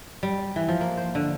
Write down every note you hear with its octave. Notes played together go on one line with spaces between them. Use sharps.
G3
E3
F3
A#3
C5
D3